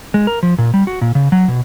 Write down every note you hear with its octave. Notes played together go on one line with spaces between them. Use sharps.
G#3
A#4
F3
A#2
G3
F#4
A#2
C#3
F#3
B2